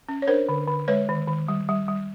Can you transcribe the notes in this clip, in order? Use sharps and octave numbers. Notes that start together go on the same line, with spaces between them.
C#4
C#5
D4 A#4 C5
D3
D3
G#3 B4 C#5
D#3
D#3
G3
G3
G3